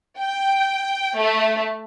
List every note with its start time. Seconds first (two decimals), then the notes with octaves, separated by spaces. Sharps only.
0.18 G5
1.16 A3